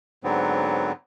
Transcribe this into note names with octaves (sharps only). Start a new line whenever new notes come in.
G#2 D3 F#3 B3 C4